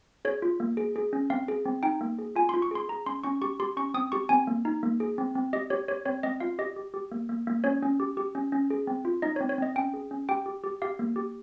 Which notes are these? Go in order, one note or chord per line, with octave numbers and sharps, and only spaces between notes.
G#4 C#5
F4
A#3
G#4
G#4
C#4
C4 F5
G#4
C4
D#4 G5
A#3
G#4
F4 G#5
F4 C6
C#6
G#4 C6
G#4 A#5
C#4 C6
C#4 C#6
G4 C#6
G4 C6
C#4 C#6
C4 D#6
G4 C#6
C4 G#5
A#3
D#4
A#3
G#4
C4
C4
G4 D#5
G4 C#5
G4 C#5
C4 C#5
C4 D#5
F4 F5
G4 D#5
G4
G4
A#3
A#3
A#3
C#4 C#5
C#4
G4
G4
C#4
C#4
G#4
C4
F4
D#4 D#5
C#5
C4
C#5
C4 D#5
C#4 G5
G#4
C#4
G4 G5
G4
G4
G4 F5
A#3
G4